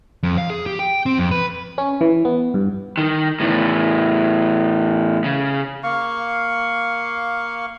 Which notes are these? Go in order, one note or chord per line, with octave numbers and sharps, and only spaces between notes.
F2
F5
G#4
G4
G5
C4
F2
B4
C#4
E3
B3
G2
D#3
E2 A2
C#3
A#3 F5 C#6